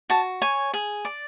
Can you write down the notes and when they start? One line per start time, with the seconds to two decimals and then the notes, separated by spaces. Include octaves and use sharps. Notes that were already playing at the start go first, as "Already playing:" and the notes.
0.10 F#4 A5
0.42 C#5 G#5
0.74 G#4
1.05 D5